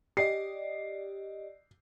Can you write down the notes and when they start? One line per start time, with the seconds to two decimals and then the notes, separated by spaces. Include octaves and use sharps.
0.17 G4 D5 D#5 C7